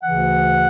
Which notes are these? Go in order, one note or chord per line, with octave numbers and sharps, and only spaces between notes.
D2 C#3 E3 F#5